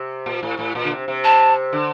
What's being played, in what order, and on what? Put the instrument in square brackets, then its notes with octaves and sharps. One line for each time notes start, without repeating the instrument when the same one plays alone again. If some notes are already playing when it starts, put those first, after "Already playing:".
Already playing: [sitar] C3
A#2
A2
A2
A#2
D3
C3
C3
[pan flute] A5
[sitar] D3